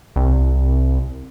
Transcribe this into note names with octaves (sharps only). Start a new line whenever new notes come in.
C2